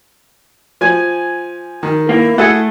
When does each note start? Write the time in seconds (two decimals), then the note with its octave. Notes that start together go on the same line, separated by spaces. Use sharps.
0.81 F3 G#5
1.83 D#3 A#4
2.09 A#3 E4
2.38 A3 G#4 A4 F#5